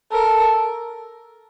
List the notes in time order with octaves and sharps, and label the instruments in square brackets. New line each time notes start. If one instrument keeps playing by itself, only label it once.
[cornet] A4 [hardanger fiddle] A#4